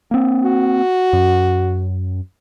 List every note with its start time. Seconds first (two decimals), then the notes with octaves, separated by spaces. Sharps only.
0.11 A#3 C4
0.43 F#4
1.13 F#2